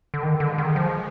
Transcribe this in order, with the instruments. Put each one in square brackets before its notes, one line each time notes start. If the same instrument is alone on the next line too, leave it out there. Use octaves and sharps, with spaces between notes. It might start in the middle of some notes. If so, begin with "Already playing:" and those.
[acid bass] D3
[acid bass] D#3 [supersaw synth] G#3
[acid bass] D3
D#3
F3